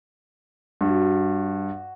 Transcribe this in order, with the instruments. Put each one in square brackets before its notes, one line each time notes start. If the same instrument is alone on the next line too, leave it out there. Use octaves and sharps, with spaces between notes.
[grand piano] G2 [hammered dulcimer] F#4